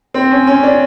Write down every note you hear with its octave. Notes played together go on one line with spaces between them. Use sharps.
C4
C#4
C#4
D4